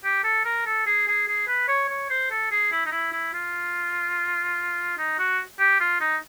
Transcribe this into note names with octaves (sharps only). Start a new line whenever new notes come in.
G4
A4
A#4
A4
G#4
G#4
G#4
B4
C#5
C#5
C5
A4
G#4
E4
D#4
E4
E4
F4
D#4
F#4
G4
F4
D#4